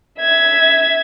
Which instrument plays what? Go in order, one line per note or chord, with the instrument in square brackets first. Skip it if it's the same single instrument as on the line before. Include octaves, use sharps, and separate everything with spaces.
[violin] E5 G#6